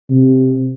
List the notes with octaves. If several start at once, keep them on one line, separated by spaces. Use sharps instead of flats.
C3